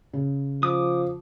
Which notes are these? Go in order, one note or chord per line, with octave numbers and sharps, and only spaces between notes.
C#3
F3 D6 D#6